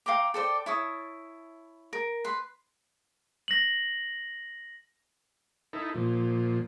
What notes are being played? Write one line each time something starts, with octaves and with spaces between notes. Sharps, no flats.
F5 G5 A#5 D6
A4 C5 D5 G5
E4 C#5 A5 D#6
A#4
B4 C6
A#6 F#7
D#4 E4 A4
A#2 F3